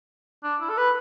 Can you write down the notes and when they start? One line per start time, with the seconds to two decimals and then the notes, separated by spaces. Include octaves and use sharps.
0.44 D4
0.61 E4
0.70 A4
0.77 B4